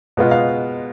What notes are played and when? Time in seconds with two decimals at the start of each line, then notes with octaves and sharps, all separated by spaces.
0.17 B2 G#3 B3 F4
0.31 F5